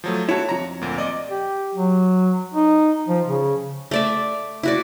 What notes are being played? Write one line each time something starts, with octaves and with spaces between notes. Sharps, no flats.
F3 F#3 A3
E4 F#4 C#5 A5
F2 A#5
D2 A#2
D5 D#5 D6
G4
F#3
D#4
F3
C#3
A3 D5 E5
E4 F#4 D5